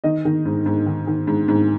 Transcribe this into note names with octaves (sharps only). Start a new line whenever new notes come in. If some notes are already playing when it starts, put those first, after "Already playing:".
D#3 D#5
D#3
G#2
G#2
D#3
D#3
G#2
G#2